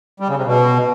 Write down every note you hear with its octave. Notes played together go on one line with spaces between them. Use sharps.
G3
C#3
C3
B2